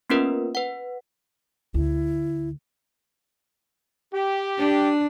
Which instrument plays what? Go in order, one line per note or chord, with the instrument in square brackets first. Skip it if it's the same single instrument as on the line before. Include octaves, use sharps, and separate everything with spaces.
[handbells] A#3 B3 C#4 F4 A#4 B4
B4 F#5
[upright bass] D2 [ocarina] E4
[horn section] G4
[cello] D4